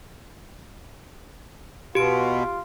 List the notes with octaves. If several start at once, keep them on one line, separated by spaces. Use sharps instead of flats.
B2 F4 G4 D7